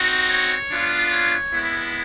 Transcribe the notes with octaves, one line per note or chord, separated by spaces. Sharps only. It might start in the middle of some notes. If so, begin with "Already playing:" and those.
Already playing: C4 D#4 F#4
C#5
B3 D4 F4
C#5
G#3 B3 E4